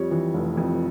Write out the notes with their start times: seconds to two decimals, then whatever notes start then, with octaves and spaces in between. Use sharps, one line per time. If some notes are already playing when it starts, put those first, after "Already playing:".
Already playing: F2 G3 C#5
0.11 E3
0.34 F1
0.57 F2